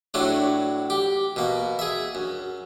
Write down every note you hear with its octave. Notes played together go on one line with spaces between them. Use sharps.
A2 F#3 A3 D4
G4
B2 A#3
G#4 E5
F#2